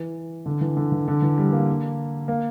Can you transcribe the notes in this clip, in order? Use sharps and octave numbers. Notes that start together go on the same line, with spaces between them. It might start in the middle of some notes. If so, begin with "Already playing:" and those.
Already playing: E3
D3
E3
D3
E3
D3
E3
G3
A#3
A#3